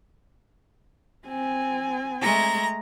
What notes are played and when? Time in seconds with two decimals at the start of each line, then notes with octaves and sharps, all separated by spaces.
1.27 C4 G#5
2.21 G#3 A3 A#5